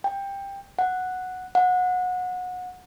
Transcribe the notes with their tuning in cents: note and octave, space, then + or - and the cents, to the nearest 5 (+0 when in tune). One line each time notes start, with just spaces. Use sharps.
G5 +15
F#5 -5
F#5 -25